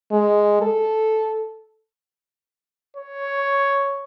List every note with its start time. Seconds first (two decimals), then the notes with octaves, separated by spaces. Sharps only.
0.12 G#3
0.62 A4
2.96 C#5